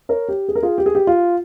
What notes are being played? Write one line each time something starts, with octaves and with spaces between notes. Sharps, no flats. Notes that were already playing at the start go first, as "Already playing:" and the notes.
A#4 C#5
G4
G#4
A#4
F4 G#4
G4
G#4
G4
F4